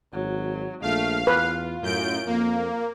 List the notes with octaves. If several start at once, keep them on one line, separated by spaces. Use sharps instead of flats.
G#1 F#3
A#1 A3 F5
E2 F4 B4
F#2 A2 G6 D7
F2 A#3